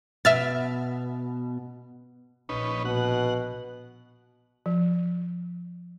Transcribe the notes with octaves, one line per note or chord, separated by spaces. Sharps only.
B2 E5 F6 A6
A#1 C#4 D#4 B4
B2 F#5
F3